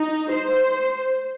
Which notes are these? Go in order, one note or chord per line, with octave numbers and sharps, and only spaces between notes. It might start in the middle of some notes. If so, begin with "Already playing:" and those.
Already playing: D#4
C5